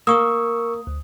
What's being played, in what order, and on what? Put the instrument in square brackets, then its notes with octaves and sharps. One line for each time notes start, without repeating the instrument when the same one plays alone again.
[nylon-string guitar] A#3 [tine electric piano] A#4 C#6 E6 [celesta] D#6
[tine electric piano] D2